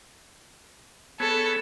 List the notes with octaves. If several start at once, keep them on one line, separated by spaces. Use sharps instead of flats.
B3 G#4 A4 C#5